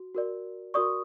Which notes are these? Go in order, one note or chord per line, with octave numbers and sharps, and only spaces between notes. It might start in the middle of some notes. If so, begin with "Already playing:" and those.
Already playing: F#4
F#4 A#4 D5
F#4 A#4 D5 C#6 D#6